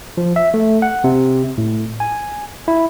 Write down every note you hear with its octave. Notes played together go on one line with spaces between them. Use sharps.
F3
E5
A3
F#5
C3
A2
G#5
E4